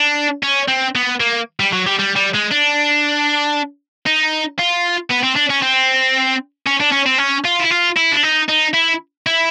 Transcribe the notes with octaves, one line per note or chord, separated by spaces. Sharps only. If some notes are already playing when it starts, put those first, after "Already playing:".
Already playing: D4
C#4
C4
B3
A#3
G3
F#3
G3
G3
G3
G#3
D4
D#4
F4
B3
C4
D4
C#4
C4
C#4
D4
C#4
C4
C#4
F4
E4
F4
E4
D4
D#4
D#4
E4
E4